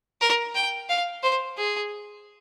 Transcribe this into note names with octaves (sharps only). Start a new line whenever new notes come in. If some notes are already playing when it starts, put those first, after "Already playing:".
A#4
G5
F5
C5
G#4